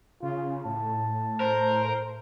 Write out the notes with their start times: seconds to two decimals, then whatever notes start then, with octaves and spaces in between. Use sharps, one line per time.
0.22 C#3 F4
0.65 A2 A5
1.40 A#4 C5